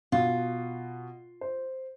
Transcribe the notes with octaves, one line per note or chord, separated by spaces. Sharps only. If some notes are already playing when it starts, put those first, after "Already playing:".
B2 F4
C5